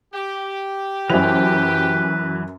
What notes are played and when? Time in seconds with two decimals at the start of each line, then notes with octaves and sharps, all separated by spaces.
0.14 G4
1.10 F#2 E3 F#3 B4 C5 F7